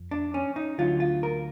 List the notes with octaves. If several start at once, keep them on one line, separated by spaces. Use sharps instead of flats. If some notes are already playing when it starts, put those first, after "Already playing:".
Already playing: F2
D4
C#4
D#4
D2 D3 F#3 F4
F4
A#4